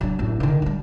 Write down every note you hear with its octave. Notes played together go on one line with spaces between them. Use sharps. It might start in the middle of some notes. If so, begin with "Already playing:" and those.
F#3 D4
A1 F#2
D3 D#3
F#3 G3